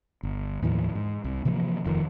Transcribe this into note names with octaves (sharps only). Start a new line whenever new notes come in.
G1
D#2 A2 E3 F3
G#2
C2
C3 E3 F3 A#3
D#1 F2 D#3 F3